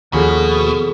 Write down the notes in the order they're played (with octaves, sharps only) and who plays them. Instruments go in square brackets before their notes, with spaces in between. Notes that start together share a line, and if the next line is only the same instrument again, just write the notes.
[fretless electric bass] D#2 [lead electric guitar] B2 [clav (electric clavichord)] F3 C#4 F#4 [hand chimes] G#4 A4 B6